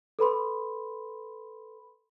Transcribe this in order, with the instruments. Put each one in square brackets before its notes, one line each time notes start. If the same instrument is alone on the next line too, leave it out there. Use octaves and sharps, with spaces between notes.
[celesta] A4 B4 B5 C6